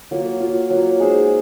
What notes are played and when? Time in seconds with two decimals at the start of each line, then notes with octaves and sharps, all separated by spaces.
0.11 F#3 A#3 F4
0.40 F#3 A#3 F4
0.70 F#3 A#3 F4
1.00 G#3 D#4 G#4 C5